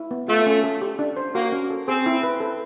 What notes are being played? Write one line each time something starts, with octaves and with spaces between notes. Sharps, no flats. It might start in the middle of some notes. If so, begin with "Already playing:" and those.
Already playing: E4
B3
A3 F4
C#4
A4
G4
D4
C5
A#3 F#4
C#4
A4
C4 G#4
E4
B4
A4